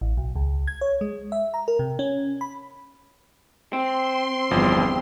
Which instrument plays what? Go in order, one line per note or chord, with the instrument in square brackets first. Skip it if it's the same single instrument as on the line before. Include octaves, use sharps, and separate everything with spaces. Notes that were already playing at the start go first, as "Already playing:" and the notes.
[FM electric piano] A1
B1
C#2
G#6
C#5
G#3
E5
A#5
A#4
C3
C#4
B5
[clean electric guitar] C4 [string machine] C6
[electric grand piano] G1 F3 [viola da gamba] E2 G2